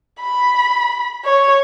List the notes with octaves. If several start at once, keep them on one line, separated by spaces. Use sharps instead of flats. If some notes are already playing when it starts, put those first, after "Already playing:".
B5
C#5